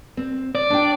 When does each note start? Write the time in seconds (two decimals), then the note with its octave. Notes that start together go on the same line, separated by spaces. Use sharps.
0.17 C4
0.55 D5
0.70 D4 G5